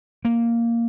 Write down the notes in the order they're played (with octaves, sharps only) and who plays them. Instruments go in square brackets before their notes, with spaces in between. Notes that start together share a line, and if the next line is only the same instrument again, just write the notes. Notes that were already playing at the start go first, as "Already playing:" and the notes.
[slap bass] A#3